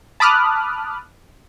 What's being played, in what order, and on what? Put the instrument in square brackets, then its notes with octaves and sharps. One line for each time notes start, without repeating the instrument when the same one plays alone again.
[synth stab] A5 B5 D6 D#6 F6 F#6